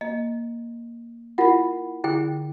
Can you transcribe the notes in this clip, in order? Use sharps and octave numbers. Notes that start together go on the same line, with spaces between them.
A#3 D#5
E4 F4 A#4 F#5 B5
D3 E4 G#4 G5